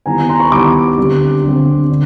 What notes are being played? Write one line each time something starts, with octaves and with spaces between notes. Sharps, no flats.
D#3 G3 B3 E4 G#5 A#5
A#5 C6
B5 C#6
D#3 G3 B3 E4 C6 D6
D3 G3 C4
D3 G3 C4
D3